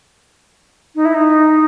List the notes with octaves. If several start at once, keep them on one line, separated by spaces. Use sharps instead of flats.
D#4
E4
D#4